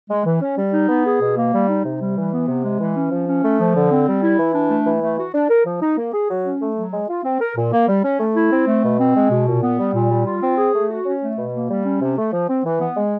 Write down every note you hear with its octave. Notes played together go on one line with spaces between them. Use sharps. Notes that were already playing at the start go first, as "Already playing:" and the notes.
G#3
E3
C#4
G3
D#4
B3
G#4
B2
A#3
G3
D#4
C3
G3
E3
B3
C3
G#3
E3
C#4
F3
C#4
A3
F3
D3
C4
G3
E4
E3
D4
A3
E3
A3
F#4
D4
A#4
F3
D#4
A#3
G#4
F#3
C#4
A3
F#3
G#3
F4
C4
A#4
A#2
A#3
G3
C#4
A3
E4
C4
A3
B2
C4
G#3
B2
A#2
B3
G3
A#2
G3
F4
C4
G#4
A3
F#4
C#4
A3
B2
A#3
G3
C#4
C3
A3
F3
C4
E3
B3
G#3